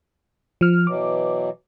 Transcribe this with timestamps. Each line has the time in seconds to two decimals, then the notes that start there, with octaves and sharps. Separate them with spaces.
0.61 F3 F6
0.87 B2 E3 F#3 D6